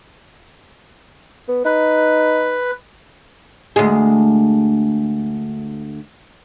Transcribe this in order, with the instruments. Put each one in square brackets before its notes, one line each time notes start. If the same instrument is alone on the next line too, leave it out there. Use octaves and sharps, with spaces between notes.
[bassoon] B3
[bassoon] D#4 [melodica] B4
[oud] D2 G#3